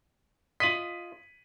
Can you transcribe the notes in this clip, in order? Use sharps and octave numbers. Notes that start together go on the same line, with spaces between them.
F4 D#5 B6 D#7 F#7